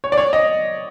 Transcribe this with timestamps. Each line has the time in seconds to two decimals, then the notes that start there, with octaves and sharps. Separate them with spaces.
0.04 C#5
0.12 D5
0.18 C#5
0.33 D#5